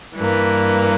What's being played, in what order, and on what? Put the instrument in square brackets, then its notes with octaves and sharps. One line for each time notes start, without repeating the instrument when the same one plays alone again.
[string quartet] G2 E3 A#3